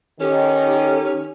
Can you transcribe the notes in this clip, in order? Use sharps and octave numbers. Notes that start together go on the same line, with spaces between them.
D#3 C#4 G4 A4